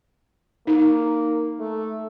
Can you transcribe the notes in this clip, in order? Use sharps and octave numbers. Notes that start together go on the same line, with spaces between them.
A#3 D#4
A3